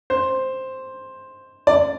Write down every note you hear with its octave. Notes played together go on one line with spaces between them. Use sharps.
C5
D5